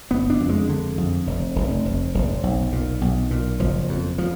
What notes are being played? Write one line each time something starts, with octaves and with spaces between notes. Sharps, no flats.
F#1 B3
D4
F2
G#3
D3
F2
F1
F1
F1
F1
B1
A#2
B1
A#2
F#1 F3
F2
F3